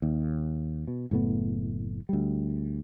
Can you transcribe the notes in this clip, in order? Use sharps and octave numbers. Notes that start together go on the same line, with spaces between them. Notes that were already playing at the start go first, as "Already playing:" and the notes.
D#2
B2
F#1 A2 A3 B3
D2 G3